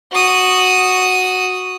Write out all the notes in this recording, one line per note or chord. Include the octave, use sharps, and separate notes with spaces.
F#4 D#6